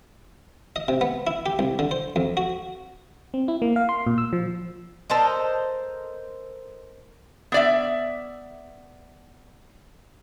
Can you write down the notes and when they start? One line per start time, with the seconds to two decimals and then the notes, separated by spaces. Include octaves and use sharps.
0.76 D#5
0.88 C3
1.01 B3
1.27 E4
1.46 G4
1.59 C2
1.79 D3
1.91 C5
2.16 F2
2.37 F#4
3.34 C4
3.48 E4
3.62 A#3
3.76 F5
3.89 C6
4.07 A#2
4.18 E6
4.33 F3
5.10 A4 A#4 C5 D#5
7.52 B3 D5 E5